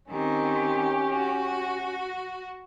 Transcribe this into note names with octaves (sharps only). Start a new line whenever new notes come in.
D#3 C4 C#4 G4
F#4